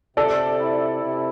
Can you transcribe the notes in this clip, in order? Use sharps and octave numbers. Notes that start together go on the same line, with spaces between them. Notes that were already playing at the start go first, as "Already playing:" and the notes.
C3 A4 D5
E4
C3